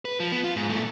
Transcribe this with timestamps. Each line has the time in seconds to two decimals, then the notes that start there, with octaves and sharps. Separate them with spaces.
0.05 B4
0.20 F3
0.32 B3
0.44 F4
0.56 G#2
0.70 A#2 A3